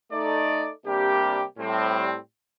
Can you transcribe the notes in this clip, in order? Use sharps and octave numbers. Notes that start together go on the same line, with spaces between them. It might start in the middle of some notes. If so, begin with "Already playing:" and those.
A3 D#4 A4 D5
C3 G3 A#3 D4 G4
A2 G3 C4